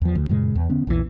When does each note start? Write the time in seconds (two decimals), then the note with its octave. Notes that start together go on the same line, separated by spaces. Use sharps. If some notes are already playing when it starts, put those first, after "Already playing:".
0.02 E2 F3
0.15 D2
0.29 F#2 A#2 C#3 G#3
0.55 E2
0.69 D3 B3 C#4
0.87 A#1 E2 D#3 E3